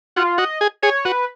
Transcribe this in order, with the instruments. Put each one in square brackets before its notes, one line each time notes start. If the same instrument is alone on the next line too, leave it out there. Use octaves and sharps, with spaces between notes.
[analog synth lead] F4 [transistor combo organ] F#4
[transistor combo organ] F#4 [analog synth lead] D#5
[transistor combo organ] G#4
[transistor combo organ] G#4 [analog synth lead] C#5
[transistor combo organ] F#4 [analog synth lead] B4